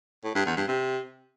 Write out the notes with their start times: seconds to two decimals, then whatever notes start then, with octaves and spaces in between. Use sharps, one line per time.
0.24 A2
0.35 G2
0.46 E2
0.57 G2
0.67 C3